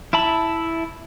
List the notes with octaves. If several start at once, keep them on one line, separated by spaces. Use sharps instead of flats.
E4 E5 A5 B5